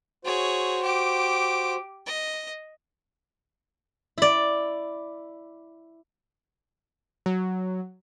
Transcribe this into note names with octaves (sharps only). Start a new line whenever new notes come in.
F#4 G#4 C5 C#5
G4 D6
D#5
E4 D5
F#3